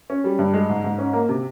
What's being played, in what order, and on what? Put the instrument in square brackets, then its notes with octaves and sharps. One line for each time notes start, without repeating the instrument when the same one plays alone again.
[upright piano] C#4
G3
G2
G#3
G#2
G#2
C#4
A#3
C3